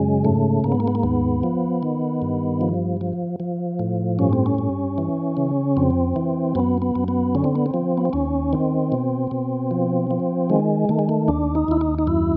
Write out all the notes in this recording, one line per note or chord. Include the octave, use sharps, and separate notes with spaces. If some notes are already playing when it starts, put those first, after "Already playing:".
Already playing: F#2 C#3 G#3
G#2 A3
G#2 A#3
B3
A#3
B3
A#3
D#2 B3
F3
D#3
G2
F3
F3
F3
A2
G2 C#4
C4
C#4
G2
E3
C#3
F2 C4
E3
F#2 B3
B3
F#2
B3
D3 C#4
C4
B3
C4
F3
B3
C4
D#2 C#4
D#3 C4
B2
B2
F3
F3
D#3 G#3
D#3 A3
G#3
A3
D#2 D4
D#4
D#2 E4
D#4
D#4
F#2 E4